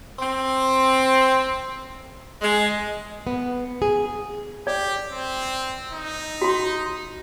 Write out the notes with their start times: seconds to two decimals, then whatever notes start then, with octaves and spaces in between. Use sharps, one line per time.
0.19 C4
2.41 G#3
3.27 B3
3.82 G#4
4.67 G4 D5
5.13 C4
5.93 D#4
6.42 F#4 C6